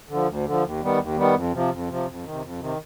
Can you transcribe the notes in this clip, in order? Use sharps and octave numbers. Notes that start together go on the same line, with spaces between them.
D3 F3
D2
D3 F3
D#2
D#3 G3 B3
D#2
D#3 G3 B3
F2
C3 F3
F2
C3 F3
F2
C3 D#3
F2
C3 D#3